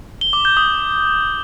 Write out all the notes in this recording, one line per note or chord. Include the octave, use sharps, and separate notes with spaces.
G7
D6
G6
D#6